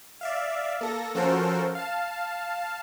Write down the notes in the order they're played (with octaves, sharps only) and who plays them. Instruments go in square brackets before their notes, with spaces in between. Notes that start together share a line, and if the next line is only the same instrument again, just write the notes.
[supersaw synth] D5 E5 F5
A#3 A4 A#6
F3 C#4 F#4 A4 A#4 C5
F5 A5